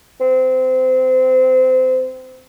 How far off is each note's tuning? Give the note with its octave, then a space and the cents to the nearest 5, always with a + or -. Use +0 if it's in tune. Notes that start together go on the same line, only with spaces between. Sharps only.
C4 -25